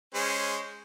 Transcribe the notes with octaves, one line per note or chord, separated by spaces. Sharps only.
G#3 C#4 C5